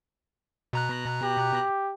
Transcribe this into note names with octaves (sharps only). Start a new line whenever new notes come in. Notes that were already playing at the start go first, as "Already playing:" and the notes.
B2 A#5 F#6
G4